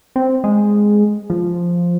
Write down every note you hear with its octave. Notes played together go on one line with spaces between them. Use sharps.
C4
G#3
F3